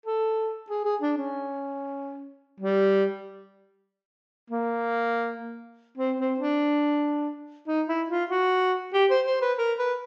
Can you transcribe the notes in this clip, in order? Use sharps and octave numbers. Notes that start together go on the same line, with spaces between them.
A4
G#4
G#4
D4
C#4
G3
A#3
C4
C4
D4
D#4
E4
F4
F#4
G4
C5
C5
B4
A#4
B4